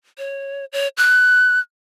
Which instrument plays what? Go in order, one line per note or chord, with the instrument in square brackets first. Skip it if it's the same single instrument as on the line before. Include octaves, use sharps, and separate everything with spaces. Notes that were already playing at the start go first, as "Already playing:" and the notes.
[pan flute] C#5
C#5
F#6